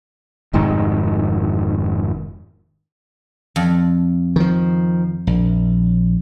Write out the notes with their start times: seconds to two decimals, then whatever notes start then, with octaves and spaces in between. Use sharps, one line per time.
0.54 F1 G#2 D#3
3.56 F2
4.36 D#3 F3
5.27 A#1